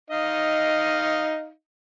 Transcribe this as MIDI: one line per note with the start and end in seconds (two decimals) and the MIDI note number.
0.10 1.50 63
0.10 1.50 75
0.10 1.50 77